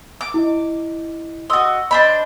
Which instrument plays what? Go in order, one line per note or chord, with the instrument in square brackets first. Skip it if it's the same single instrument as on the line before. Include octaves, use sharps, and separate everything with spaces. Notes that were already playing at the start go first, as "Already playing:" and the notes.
[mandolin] D6
[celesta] E4 D#5
[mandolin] F#4 D#5 [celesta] C6 E6
[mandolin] D4 C5 B5 [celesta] D#5